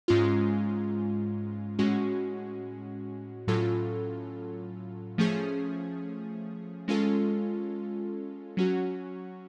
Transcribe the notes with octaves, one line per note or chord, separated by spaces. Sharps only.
G#2 G#3 C#4 F4
A2 G#3 C#4 F#4
A2 F#3 C#4 F4 A4
F3 A3 C#4 G#4
G#3 C#4 F4 A4
F#3 C#4 F#4